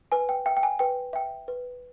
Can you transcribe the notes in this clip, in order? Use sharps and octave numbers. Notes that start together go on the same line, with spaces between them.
B4 G#5
G5
E5 G5
G5
G#5
B4 G5
E5 G5
B4